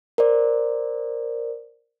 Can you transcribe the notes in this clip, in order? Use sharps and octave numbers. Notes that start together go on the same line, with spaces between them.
A#4 C5 D5